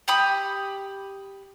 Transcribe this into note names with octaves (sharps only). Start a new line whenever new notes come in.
G4 B5 D#6